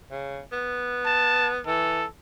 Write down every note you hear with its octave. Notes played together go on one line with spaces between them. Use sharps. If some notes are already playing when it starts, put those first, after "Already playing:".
C#3
B3
A5
E3 A4